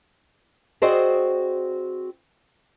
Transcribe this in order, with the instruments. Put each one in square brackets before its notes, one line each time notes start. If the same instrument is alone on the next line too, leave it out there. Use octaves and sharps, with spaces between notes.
[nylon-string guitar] C4 F#4 G#4 C5 D5 D#5